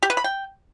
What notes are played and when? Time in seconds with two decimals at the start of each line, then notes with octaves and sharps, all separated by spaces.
0.03 G4
0.10 B4
0.17 B5
0.24 G5